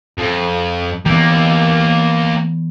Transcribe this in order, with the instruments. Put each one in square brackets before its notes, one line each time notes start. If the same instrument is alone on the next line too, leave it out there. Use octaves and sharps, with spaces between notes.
[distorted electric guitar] F2
[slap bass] E3 B3 [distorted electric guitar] A#3 G4